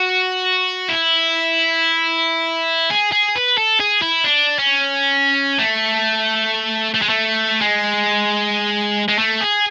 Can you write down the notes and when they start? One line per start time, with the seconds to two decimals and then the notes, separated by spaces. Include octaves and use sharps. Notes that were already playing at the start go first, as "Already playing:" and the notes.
Already playing: F#4
0.89 E4
2.90 G#4
3.12 G#4
3.36 B4
3.58 A4
3.80 G#4
4.02 E4
4.24 D4
4.59 C#4
5.59 A3
6.94 A3
7.02 G#3
7.09 A3
7.61 G#3
9.09 G#3
9.19 A3
9.41 G#4